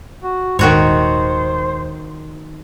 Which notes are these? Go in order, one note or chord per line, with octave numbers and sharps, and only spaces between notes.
F#4
D#1 G#2 D#3 F#4 C5 C#5